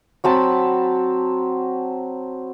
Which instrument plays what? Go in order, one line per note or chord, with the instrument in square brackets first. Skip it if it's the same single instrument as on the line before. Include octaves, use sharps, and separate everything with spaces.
[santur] F#3 C4 A5 B5